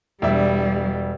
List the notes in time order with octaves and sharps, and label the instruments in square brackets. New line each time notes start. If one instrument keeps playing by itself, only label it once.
[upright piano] E1 D4 E5 [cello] G3